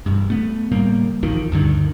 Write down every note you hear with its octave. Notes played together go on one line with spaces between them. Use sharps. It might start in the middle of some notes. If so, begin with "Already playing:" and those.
E1 G2
A3 B3
A2 C#3 G3 A#3
A#1 E2 D#3 F3
D2 G2 D3 D#3